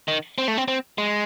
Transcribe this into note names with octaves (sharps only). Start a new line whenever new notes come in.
D#3
C4
A3
C4
C4
G#3